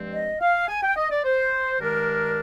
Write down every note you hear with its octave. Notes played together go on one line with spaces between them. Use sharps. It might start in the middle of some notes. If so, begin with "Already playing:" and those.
Already playing: G2 F3 G#3 C4
D#5
F5
G#5
G5
D#5
D5
C5
G2 D#3 G#3 D4 A#4